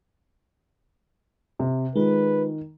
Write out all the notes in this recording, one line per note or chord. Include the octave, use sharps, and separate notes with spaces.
C3
D#3 G#3 F4 B4